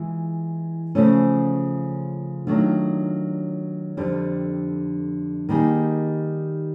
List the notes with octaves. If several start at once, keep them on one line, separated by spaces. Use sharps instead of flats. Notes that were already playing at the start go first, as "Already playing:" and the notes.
Already playing: E3 G#3 F4
C#3 F3 A3 C#4
D#3 F#3 A3 D4 F4
F2 D3 G3
D#3 G3 A#3 D#4 G#4